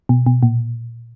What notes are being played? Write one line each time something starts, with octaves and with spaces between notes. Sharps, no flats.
B2
B2
A#2